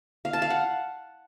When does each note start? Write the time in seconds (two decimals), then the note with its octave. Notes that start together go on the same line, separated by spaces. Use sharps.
0.25 F5
0.33 A5
0.42 F5
0.50 F#5